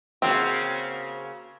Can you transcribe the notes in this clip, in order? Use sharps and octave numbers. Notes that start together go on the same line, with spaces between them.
C#3 A#3 C4 F#4